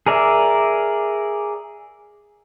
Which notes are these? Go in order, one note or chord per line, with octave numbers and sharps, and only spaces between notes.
G#4 A#4 D5 E5